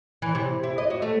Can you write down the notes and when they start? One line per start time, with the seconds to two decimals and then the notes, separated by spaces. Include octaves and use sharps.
0.22 E3
0.35 C3
0.63 E4
0.78 D#5
0.90 F#4
1.02 A3